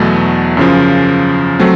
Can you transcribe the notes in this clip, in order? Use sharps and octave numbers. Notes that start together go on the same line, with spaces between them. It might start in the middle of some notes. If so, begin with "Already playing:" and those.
Already playing: E2 B2 F#3 A3
F#2 C#3 F3
F#3 A3 C4